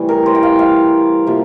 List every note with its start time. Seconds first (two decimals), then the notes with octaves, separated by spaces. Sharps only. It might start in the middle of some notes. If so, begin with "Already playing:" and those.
Already playing: A2 C3 E3 G3
0.09 A#4
0.26 C5
0.35 G5
0.43 F5
0.59 F5
1.27 C3 F3 A#3